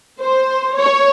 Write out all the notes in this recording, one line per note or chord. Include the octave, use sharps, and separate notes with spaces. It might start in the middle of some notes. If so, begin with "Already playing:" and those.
C5
C#5